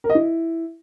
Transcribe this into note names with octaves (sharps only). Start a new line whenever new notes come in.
A#4
D#5
E4